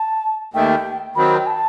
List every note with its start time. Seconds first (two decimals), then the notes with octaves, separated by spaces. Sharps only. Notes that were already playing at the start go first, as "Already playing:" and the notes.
Already playing: A5
0.54 D#2 D#3 A3 G5
1.15 D#3 F#3 C4 B5
1.36 G5
1.47 A5